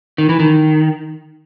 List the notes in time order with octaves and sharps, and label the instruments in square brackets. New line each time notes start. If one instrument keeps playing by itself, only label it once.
[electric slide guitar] D#3
E3
D#3